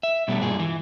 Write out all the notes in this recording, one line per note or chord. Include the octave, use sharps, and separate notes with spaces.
E5
B2 G3 A3 B3
G2 A#2 G#4
E3